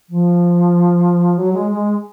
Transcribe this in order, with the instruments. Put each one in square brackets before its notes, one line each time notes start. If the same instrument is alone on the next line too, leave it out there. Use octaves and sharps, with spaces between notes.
[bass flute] F3
F#3
G#3
G#3